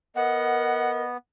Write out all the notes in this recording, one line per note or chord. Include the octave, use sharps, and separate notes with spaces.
B3 A#4 D#5 F#5